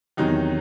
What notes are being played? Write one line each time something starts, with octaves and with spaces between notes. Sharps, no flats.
E2 C3 D#3 F#3 D#4